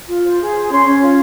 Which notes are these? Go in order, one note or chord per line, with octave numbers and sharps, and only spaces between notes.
F4
C5
G#4
C5
C#4 C6
C#4
F4